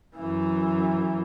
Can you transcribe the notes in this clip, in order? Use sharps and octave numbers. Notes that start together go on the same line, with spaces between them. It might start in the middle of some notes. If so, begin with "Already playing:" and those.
F#2 E3